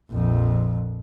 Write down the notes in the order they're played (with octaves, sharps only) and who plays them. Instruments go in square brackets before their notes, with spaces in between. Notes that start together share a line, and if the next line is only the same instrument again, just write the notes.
[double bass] A#1 F2